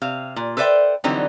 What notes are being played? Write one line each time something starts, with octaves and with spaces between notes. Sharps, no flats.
C3 F5
A#2
A4 B4 C5 D5 E5 G5
D3 E3 F#3 G3 C4 D#4